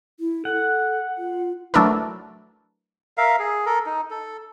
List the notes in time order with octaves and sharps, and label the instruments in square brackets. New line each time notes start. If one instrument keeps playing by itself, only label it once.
[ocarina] E4
[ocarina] A4 [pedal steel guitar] F#5
[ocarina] F4
[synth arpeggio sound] F#3 A3 D4 E4 A#4 B4
[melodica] A#4 E5 F5
G#4
A4 A#4
D#4
A4